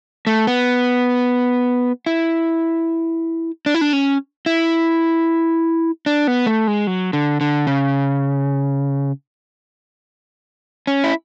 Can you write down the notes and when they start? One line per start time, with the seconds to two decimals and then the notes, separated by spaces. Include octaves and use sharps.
0.27 A3
0.47 B3
2.06 E4
3.66 D4
3.74 E4
3.81 D4
3.93 C#4
4.46 E4
6.06 D4
6.27 B3
6.46 A3
6.67 G#3
6.87 F#3
7.13 D3
7.41 D3
7.67 C#3
10.87 C#4
11.04 E4